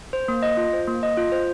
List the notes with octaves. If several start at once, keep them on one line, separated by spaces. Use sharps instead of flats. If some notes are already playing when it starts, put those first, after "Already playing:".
C5
A#3
D#5
F4
C5
A#3
D#5
F4
C5